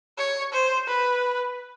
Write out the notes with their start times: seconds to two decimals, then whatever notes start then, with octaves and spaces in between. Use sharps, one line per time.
0.18 C#5
0.53 C5
0.88 B4